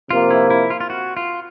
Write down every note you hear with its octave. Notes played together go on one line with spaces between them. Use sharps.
C3 F3 A#3 F4
E4
E4
F4
F4
F#4
F4